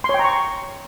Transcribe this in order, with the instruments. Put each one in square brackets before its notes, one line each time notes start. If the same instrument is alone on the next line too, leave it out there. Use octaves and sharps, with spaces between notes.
[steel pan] C6
C#5
G5
A#5
C#6